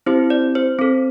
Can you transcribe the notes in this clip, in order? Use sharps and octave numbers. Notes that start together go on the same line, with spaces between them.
C4 E4 G4 C5
D5
C5
C4 A4